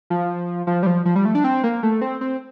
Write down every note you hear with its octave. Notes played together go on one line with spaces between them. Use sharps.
F3
F3
G3
F3
F3
G3
A3
D4
C4
A#3
A3
C4
C4